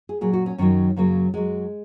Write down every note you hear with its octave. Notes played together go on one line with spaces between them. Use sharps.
G#4
A#2 F#3 G#4
F#4
C#4
F#2 D#3 F#3 C#4
F#2 C#3 F#3 A#3
F#2 F#3 G#3